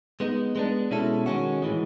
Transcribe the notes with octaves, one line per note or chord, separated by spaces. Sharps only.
G#3 B3 D#4
G#3 B3 D4
B2 G#3 C#4 E4 A4
D#3 G#3 C#4 F#4
A2 E3 G#3